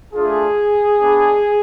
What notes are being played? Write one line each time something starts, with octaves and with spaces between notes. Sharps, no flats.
A3 D4 F4 G#4
G#3 B3 D4